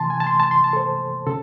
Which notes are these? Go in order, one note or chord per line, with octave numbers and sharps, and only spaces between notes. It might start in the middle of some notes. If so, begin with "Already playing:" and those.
Already playing: C3 E3 A5 C6
G#5
A5
C6
A5
C6
A5
A4
C5
C#3 A4